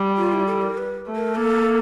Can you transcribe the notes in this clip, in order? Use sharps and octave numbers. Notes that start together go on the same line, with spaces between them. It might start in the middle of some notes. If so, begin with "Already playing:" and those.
Already playing: G3
F4
E4
A4
A#4
B4
A3
A#4
A#3 A4